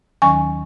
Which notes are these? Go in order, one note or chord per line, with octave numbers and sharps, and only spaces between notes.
D#2 D#3 F#3 C#4 G#5 C#6